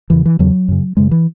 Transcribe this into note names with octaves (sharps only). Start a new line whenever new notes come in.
E2 C#3 E3
E3
E2 C#3 F#3
F#2 C#3
F#2 C#3 G#3
E3